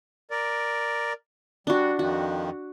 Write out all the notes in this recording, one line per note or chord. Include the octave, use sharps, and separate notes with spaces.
A#4 D5
G3 D4 F#4
F2 D#3 F3 F#4